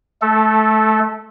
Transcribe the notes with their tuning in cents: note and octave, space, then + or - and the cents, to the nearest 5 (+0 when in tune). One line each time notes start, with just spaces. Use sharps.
A3 -20 A4 +0